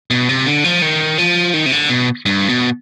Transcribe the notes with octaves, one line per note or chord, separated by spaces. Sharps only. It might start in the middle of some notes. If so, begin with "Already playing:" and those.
B2
C3
D3
F3
D#3
F3
D#3
C3
D3
B2
G2
B2